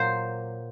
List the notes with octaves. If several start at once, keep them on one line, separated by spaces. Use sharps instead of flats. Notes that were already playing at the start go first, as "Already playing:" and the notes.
Already playing: A#2 F#3 A#3 C5